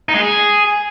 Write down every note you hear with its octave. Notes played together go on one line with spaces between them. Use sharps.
D#4
G#3
G#4